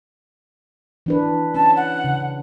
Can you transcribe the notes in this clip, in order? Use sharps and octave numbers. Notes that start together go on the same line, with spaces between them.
E3 D4 B4
C#4 A5
F#5
C#3